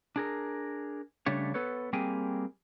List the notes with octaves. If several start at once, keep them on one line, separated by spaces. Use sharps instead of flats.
D4 G#4 A#4
C#3 G3 A3 D4 C#5
B3 A4 B4 C#5
G3 A#3 C4 G#4 G5 G#5